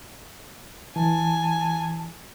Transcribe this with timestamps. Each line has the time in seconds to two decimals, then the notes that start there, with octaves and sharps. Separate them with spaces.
0.96 E3 G#5 A5